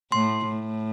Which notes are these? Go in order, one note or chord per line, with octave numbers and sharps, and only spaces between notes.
A2 C6
A2